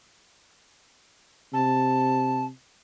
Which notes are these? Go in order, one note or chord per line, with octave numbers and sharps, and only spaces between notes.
C3 A5